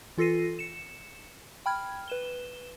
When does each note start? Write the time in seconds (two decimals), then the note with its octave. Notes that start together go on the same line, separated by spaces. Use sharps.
0.18 E3 F4 A4 A#6 C7 D#7
0.59 C#7 E7
1.66 G5 B5 F6 G#6
2.08 B4 E7 G7